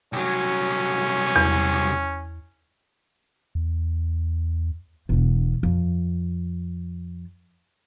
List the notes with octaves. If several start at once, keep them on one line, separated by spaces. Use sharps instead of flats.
C2 F#3 C#4
E2
E2
E1 D3
F2